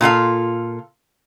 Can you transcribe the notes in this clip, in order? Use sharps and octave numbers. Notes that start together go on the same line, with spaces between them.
A#2 F4 A4 F5